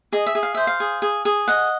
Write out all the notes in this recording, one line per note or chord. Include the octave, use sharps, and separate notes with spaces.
G#4 D#5
E5
G#4
F5
C5 E5
F5
G#4
G#4
G#4
D#5 F#5